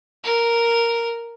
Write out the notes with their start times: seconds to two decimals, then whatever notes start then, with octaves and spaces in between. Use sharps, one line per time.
0.24 A#4